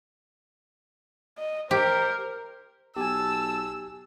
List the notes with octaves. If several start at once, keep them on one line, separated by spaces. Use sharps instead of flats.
D#5
G4 A#4 C5
B1 G4 G#5 A5 E6